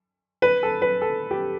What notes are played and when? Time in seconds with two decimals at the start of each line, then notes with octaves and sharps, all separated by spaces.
0.42 B4
0.63 A4
0.82 B4
1.02 A4
1.31 G4